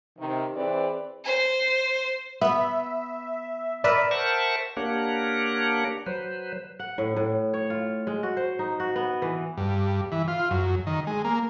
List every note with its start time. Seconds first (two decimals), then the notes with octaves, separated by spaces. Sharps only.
0.19 C3 D#3
0.56 E3 C4 G#4 B4 D5
1.24 C5
2.41 B3 E5
3.84 A#4 B4 D5 E5
4.11 A#4 C5 E5 F#5 A5 C#6
4.77 A#3 D4 G4 A#4 C#5 F#5
6.06 F#3 B4 C5
6.79 F#5
6.98 A2
7.16 A2
7.54 C#5
7.70 F4
8.07 G#3
8.23 F#4
8.37 C5
8.59 D#4
8.80 F#4
8.96 B3
9.22 E3
9.57 G2
10.12 E3
10.28 F4
10.51 F#2
10.87 D#3
11.07 G#3
11.25 A#3